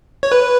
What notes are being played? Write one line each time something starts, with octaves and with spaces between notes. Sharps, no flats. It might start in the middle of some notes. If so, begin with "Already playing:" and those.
C#5
B4